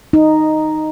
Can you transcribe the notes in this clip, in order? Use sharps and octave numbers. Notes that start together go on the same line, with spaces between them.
D#4